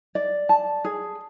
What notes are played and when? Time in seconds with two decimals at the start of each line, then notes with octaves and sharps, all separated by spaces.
0.15 D5
0.49 A5
0.85 G#4